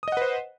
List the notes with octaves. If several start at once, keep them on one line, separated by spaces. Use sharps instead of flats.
B4 C5 D#5 F#5 D#6